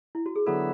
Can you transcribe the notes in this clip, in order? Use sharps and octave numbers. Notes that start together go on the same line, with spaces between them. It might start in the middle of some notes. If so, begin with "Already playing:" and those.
E4
F#4
G#4
D3 F#3 B3 E4 A4